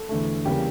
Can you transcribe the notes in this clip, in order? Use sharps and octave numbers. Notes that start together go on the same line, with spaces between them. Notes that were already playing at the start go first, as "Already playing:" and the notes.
Already playing: A4
E2 D3 A3
E2 C#3 G3 A#3 G4